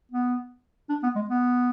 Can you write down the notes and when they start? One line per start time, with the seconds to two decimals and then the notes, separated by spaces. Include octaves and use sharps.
0.12 B3
0.89 D4
1.03 B3
1.15 G#3
1.29 B3